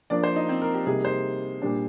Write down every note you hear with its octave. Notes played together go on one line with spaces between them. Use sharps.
F3 A#3 D4 D5
C5
D#4
C4
A#4
G4
C3 G3 A#3 D#4 G#4
C5
A#2 G3 D4